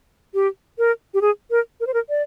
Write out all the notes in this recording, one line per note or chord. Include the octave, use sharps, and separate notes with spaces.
G4
A#4
G4
G#4
A#4
A#4
C5
A#4
D5